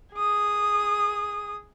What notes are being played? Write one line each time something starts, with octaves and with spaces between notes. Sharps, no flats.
G#4 D#6